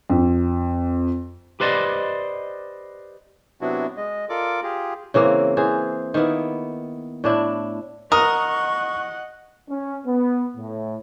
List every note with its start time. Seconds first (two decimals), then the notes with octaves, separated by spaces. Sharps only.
0.10 F2
1.60 G4 B4 C5 D5 D#5
3.61 C3 F#3 B3 D4 E4 F#4
3.97 G#3 D#5
4.29 F4 A4 A#4 D5 D6
4.63 F4 G4 G#4
5.14 C#3 E3 A#3 C4
5.57 E3 G#4 C5
6.14 D#3 A#3 B3 E4
7.24 A2 D4 E4
8.12 A#4 D#5 F#5 C#6 D#6
9.68 C#4
10.05 B3
10.56 A2